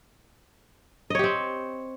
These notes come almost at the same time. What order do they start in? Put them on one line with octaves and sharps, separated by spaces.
D#5 C#5 G4 C4